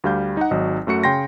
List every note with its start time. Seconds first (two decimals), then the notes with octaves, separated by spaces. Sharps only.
0.04 D2 G3 F5 G6
0.37 D#4 F#5
0.51 G#1 F#3 D#4 D#5
0.87 F#2 A3 F#4 C#7
1.03 C#3 G5 C6 A#6